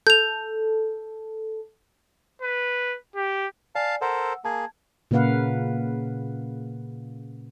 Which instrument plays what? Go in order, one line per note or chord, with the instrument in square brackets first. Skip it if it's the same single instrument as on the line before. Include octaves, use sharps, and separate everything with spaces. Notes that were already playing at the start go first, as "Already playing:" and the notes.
[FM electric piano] A4 [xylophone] G6 F7
[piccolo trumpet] B4
G4
[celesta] D5 G#5 [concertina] F5 A5
[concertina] A4 A#4 C5 [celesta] F#5 E6
[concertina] A#3 G#4 [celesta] A5 G#6
[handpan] A#2 C#3 A#3 B4 F5 F#5